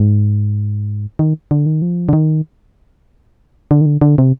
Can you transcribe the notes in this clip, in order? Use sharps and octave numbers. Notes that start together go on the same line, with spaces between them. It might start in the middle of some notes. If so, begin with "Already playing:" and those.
Already playing: G#2
D#3
D3
D#3
F3
D3
D#3
D3
D#3
D3
D3
C3